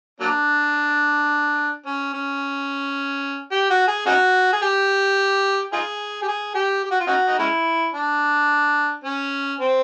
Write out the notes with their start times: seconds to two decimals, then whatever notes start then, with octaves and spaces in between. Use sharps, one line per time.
0.20 F#3 A#3 D4
1.86 C#4
2.14 C#4
3.52 G4
3.70 F#4
3.88 G#4
4.06 C#4 D#4 F#4
4.53 G#4
4.62 G4
5.73 D#4 F4 G#4
6.22 G4
6.28 G#4
6.55 G4
6.83 G4
6.91 F#4
7.00 F4
7.07 C#4 D#4 F#4
7.28 D#4
7.39 G#3 C#4 E4
7.94 D4
9.04 C#4
9.60 C4